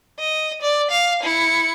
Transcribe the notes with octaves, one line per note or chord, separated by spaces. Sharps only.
D#5
D5
F5
E4 C#7